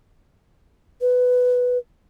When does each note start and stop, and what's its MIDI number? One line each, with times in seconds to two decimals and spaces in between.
1.01 1.78 71